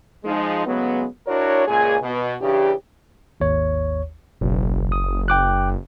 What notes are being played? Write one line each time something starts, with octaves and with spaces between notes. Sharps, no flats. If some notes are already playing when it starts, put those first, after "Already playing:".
F3 G#3 D#4
A2 C#3 F#3 G#3 B3
D4 E4 F#4 A#4 C#5
C#2 A#2 G#4 G#5
B2
C#3 E3 D4 G4
G#1 D#2 C#5
F#1 B1
D#6
G5 D6 F#6